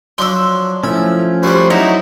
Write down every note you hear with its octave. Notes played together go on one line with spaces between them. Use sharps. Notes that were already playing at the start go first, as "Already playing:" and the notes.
F3 F#3 D4 C6 E6
F3 A3 C#4 E4
G3 F#4 G4 C5
F#3 D#4 E4 F#4 A#5